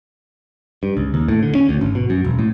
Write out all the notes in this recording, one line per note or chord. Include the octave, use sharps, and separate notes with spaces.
G2
C#2
D#2
A2
D3
C#4
D2
G#1
B2
F#2
E1
A2